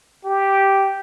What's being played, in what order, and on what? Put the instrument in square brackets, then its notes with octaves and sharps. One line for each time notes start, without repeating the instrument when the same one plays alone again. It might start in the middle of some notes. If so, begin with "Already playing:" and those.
[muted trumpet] G4